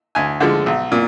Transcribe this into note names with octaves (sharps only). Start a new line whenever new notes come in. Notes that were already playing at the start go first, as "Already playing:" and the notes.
D2 G#5
D3 F3 G#3
B1
A#2